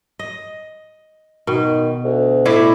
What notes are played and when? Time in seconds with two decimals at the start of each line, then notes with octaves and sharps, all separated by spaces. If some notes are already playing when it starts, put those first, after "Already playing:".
0.19 D#5
1.47 B2 D#3
2.04 D2
2.45 A2 E4 D5